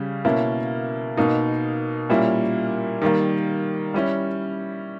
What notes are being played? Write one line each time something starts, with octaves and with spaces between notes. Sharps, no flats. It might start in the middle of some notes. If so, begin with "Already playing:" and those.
Already playing: C#3 G3 C#4
B2 A#3 C#4 E4
B2 A#3 D#4
A#2 G3 A#3 C#4 E4
D#3 G3 A#3
G3 C#4 E4